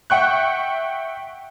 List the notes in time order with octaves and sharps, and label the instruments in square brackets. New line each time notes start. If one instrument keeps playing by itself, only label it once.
[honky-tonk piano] E5 F#5 G5 C#6 F#6